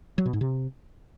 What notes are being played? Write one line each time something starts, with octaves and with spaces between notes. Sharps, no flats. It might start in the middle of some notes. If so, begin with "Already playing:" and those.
F#3
B2
G#2
C3